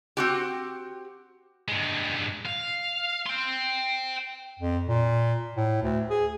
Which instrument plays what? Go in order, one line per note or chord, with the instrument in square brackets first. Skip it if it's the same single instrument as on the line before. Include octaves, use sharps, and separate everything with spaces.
[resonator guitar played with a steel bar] C4 F#4 G4
[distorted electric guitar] G2 G#3
F5
G5 C6
[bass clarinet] F2
A#2
A2
D2
G#4